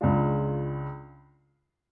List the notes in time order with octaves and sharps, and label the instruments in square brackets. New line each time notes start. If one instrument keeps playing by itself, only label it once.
[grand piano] C#2 C#3 G#3 D4 F4